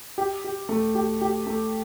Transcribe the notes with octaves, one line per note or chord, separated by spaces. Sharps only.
G4
G4
A3
G4
G4
A3